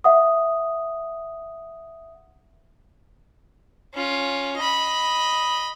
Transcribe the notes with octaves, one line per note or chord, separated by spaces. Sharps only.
E5 F#5 D#6
C#4 F4
D#5 B5